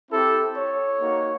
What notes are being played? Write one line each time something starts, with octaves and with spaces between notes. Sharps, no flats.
C4 E4 G4 A4
C#5
A#3 D#4 F#4